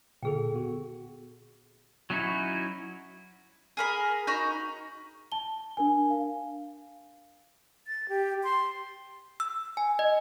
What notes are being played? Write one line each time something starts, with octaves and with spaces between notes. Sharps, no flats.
A#2 D3 G#4 A4 G5
B3 F#4
F#3 C#4 D#4 E4 F#4
G#4 A#4 B5
D#4 F#4 A#5 B5
A5 G7
D4 A#4 G#5
F5
A6
G4
C6
E6
G#5
D#5